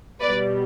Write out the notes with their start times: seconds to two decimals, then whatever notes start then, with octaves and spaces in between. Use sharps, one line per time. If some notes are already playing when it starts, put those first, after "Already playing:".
0.20 B2 G3 B4 D5